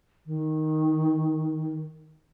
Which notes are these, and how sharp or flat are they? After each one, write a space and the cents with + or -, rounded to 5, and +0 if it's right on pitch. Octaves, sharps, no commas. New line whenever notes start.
D#3 +5